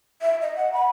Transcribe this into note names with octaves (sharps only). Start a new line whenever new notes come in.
E5
D#5
F#5
B5